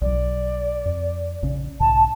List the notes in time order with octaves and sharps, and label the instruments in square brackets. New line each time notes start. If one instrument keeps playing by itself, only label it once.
[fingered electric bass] B1 F#3 [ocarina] D5
[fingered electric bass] F2
A#1 C#3 C#4
[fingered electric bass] B1 G#2 C#3 [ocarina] A5